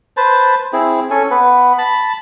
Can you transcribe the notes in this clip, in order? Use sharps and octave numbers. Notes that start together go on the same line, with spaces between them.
B4 C5 A5
C4 E4 G#4
C#4 A4 G#5
B3 B4
A5 B5